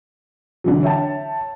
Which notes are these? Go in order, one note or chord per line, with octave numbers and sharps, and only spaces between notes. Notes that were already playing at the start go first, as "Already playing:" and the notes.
D3 E3 F#3
C#5 E5 G5 A5